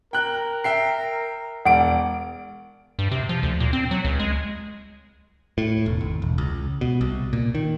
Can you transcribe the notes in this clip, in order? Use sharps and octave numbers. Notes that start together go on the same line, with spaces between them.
A#4 G5 F#6
E5 G5 C7
E1 D5 F#5 D7
G2
C3
F3
D2
A#2
C4
F#3
C#2
G#3
A2
E1
G#1
E1
C#2
B2
C2
A#2
D#3